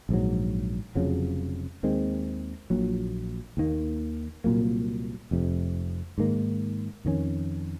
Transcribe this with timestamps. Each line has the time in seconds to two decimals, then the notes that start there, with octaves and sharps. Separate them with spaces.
0.09 A#1 G#2 D#3 F#3
0.95 F1 F2 C#3 F#3
1.83 D#2 D#3 G#3 C4
2.70 A#1 A#2 F#3
3.57 D#2 D#3 A#3
4.44 C2 A#2 F#3 A#3
5.31 F1 F2 C3
6.18 G#2 D#3 A#3
7.05 F2 D#3 A#3 C#4